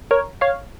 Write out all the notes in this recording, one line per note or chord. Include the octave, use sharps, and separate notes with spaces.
A#4 C#5
C#5 F5